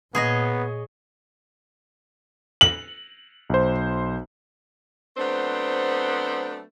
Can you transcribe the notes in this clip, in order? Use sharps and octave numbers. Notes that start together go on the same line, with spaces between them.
A#2 B3 G#4 C#5 D#5
F#7
B1 C5
F#3 A3 B3 C4 D4 C5